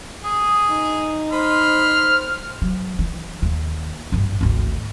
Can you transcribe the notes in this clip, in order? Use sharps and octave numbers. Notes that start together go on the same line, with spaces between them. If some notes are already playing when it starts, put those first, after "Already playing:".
G#4 D#6
D#4
C5 B5 C6 F6
F#3
E3
D#2 A#3
G#1 G2
G#1 D2